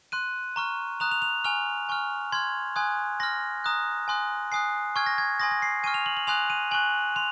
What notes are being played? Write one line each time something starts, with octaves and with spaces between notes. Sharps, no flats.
C6 F#6 D#7
A#5 C#6 F6
A#5 D#6 F#6 F7
F7
F7
G#5 C#6 F6 F7
G#5 C#6 F6
C6 F6 G#6
G#5 C6 D#6 F#6 G#6
C6 F6 A#6
A#5 D#6 F#6
G#5 C6 D#6 F#6
G#5 D#6 F#6 C7
G#5 C#6 F6 G#6
A#6
G#6
G#5 C6 D#6 A#6
A#6
C7
G#5 C#6 F6 D#7
F7
F#7
F#7
G#5 C6 D#6 F#6 F7
D#7
G#5 C#6 F#6 F#7
C6 F7